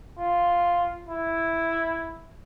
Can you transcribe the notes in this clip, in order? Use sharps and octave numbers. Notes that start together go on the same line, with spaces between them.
F4
E4